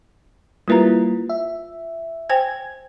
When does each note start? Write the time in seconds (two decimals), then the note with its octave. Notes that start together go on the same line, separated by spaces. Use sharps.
0.68 G3 A#3 E4 F4 B4 A#5
1.29 E5
2.29 C5 G5 G#5 G#6